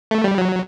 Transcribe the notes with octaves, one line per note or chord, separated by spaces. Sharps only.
A3
G3
F#3